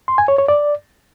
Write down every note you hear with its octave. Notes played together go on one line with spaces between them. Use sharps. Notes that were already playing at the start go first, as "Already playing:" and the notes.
C6
G#5
C#5
C#5
D5